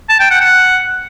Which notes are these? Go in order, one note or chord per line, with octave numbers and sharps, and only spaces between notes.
A5
G5
F#5
F#5